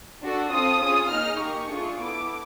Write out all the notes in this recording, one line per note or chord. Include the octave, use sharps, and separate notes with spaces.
D4 F#4 A4
C4 F4 A4 D#6
C#4 F4 G#4 D#6
A#3 D#4 G#4 F6
A#3 D#4 G4 C#6
A3 D4 F4 G#4
B3 E4 A4 D6